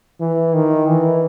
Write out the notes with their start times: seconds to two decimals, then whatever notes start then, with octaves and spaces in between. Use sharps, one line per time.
0.21 E3
0.54 D#3
0.86 E3